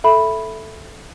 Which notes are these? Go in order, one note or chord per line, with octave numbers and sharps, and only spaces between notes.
A4 E5 B5